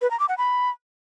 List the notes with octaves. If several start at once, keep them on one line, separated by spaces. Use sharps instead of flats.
B4
A#5
D6
F#5
B5